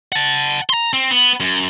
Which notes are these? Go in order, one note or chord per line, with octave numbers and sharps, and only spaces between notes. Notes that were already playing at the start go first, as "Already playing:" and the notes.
F#5 A5
A#5 C6
C4
B3
F#2